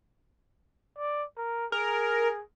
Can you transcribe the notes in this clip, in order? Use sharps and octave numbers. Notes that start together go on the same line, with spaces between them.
D5
A#4
G#4 A#4